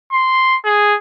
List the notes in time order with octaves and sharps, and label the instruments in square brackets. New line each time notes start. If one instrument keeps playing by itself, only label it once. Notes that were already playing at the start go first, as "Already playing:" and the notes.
[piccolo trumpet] C6
G#4